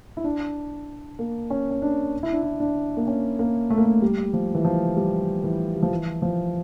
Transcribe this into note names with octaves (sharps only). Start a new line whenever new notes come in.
E4
D4
A#3
C#4
C#4
D4
E4
D4
E4
D4
A#3
C#4
A#3
A3
A#3
A3
G3
F3
E3
F3
G3
E3
G3
F3
E3
F3